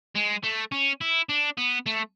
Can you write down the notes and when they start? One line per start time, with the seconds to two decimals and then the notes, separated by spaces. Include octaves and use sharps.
0.15 G#3
0.43 A3
0.72 C#4
1.01 E4
1.29 D4
1.58 B3
1.86 A3